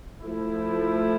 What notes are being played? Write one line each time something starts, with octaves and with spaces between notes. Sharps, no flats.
F3 A3 E4